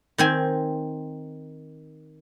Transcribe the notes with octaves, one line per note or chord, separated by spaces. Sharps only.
D#3 C4 G#5